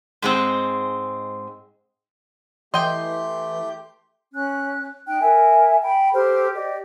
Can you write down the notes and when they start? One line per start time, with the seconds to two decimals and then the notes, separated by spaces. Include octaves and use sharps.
0.22 G#2 G#3 C4
2.74 E3 A3 G4 D#5 G5 C6 G6
4.33 C#4 F#6
5.06 D#4 G5 F#6
5.20 A#4 E5 G#5
5.83 G5 B5
6.13 G4 A4 C5 F6
6.54 G4 D5 D#5